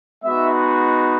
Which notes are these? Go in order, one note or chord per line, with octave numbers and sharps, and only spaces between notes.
G#3 B3 D#4 F#4 E5